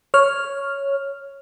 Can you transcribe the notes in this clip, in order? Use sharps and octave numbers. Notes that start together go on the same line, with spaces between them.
C#5 F6